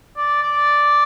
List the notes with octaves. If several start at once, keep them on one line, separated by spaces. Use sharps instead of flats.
D5
D5